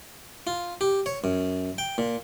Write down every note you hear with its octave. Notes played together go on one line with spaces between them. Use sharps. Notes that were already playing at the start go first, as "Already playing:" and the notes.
F4
G4
C#5
F#2
G5
A#2